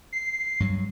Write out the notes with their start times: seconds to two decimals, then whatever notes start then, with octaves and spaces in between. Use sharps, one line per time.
0.12 C7
0.60 G2 F#3